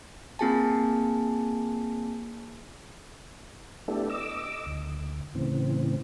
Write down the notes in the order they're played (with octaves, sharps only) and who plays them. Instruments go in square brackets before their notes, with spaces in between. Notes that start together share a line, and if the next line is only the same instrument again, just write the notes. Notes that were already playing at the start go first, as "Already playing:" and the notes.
[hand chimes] A#3 C4 F4 G#4 G#5 A5
[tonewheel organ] A3 B3 D4 E4 G4 A4
D#5 D6 E6
D2
A2 C#3 E3 C4